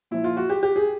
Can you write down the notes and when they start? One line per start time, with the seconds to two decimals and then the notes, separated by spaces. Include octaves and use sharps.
0.11 A#2 F3 E4
0.24 F4
0.37 F#4
0.50 G4
0.63 G4
0.76 G#4